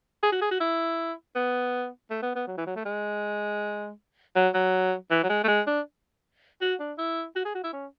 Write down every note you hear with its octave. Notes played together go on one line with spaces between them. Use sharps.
G#4
F#4
G#4
F#4
E4
B3
A3
B3
B3
F#3
E3
F#3
A3
G#3
F#3
F#3
E3
F#3
G#3
A3
G#3
D4
F#4
D4
E4
F#4
G#4
F#4
E4
C#4